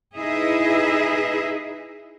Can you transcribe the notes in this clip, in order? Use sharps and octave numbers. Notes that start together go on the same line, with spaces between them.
D#4 E4 G#4 B4 D#5 E5